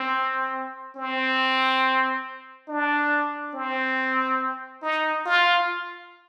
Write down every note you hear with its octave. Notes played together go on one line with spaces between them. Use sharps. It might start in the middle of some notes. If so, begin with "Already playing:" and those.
Already playing: C4
C4
D4
C4
D#4
F4